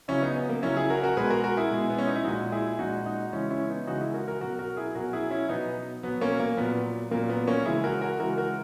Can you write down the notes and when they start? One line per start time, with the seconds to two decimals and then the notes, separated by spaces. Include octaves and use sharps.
0.08 C#3 F#3 C#4 E4
0.22 B3 D#4
0.36 B3
0.49 A#3
0.62 C#3 F#3 C#4 E4
0.76 E4 G#4
0.90 F#4 A#4
1.03 F#4 A#4
1.17 B2 G#3 G#4 B4
1.30 F#4 A#4
1.44 F#4 A#4
1.57 E4 G#4
1.71 B2 G#3
1.90 B3
1.98 C#4
2.07 D#4
2.16 E4
2.24 A#2 G#3 D#4 F#4
2.52 E4 G#4
2.79 A#2 G#3 D#4 F#4
3.06 D#4 F#4
3.33 C#3 E3 G#3 C#4 E4
3.50 C#4 E4
3.69 B3 D#4
3.87 C#3 E3 G#3 D#4 F#4
4.01 E4 G#4
4.14 F#4 A#4
4.28 F#4 A#4
4.41 B2 F#3 F#4 A#4
4.59 F#4 A#4
4.77 E4 G#4
4.95 B2 F#3 F#4 A#4
5.13 E4 G#4
5.31 C#4 E4
5.49 B2 F#3 B3 D#4
6.03 B2 F#3 B3
6.21 A#3 C#4
6.40 A#3
6.57 A#2 F#3 B3
7.11 A#2 F#3 A#3
7.29 B3
7.47 A#3 C#4
7.65 C#3 E3 G#3 E4 G#4
7.84 F#4 A#4
8.01 F#4 A#4
8.19 C#3 E3 G#3 F#4 A#4
8.37 F#4 A#4